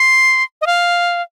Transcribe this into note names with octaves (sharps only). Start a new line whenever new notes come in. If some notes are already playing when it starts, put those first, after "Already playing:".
Already playing: C6
D#5
F5